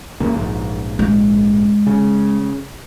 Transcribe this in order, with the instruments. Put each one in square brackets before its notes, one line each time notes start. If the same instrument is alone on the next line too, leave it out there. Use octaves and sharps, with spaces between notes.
[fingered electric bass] E2 C#3 A#3
A#1 G#2
[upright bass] G#3
[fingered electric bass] C#3